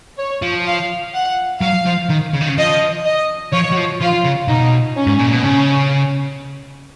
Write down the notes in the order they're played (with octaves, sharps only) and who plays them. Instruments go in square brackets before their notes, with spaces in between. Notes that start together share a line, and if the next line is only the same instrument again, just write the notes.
[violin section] C#5
[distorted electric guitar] F3
[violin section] F5
F#5
[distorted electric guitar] F#3 [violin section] F5
[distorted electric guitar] F3
D#3
C#3
D#3
C#3
[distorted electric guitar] F3 [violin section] D#5
[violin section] D#5
[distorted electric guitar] F3 [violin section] C#5
[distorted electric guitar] F#3
F3
[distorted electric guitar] F3 [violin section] F4
[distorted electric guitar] C#3
[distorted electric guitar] B2 [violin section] D#4
[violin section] C#4
[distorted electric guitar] G#2
A#2
B2
[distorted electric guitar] C#3 [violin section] C#4